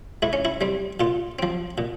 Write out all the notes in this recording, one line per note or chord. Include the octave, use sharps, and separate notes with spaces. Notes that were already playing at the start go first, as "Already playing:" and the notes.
G#2 E4
C#4
E4
G3 C4
A#2 F4
F3 C4
A#2